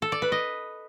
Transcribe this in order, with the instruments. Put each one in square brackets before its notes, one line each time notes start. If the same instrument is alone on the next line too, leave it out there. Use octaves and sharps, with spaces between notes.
[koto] A4
D5
B4
D#5